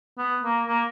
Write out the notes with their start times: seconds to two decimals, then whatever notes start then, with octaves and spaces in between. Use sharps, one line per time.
0.18 B3
0.43 A#3
0.67 A#3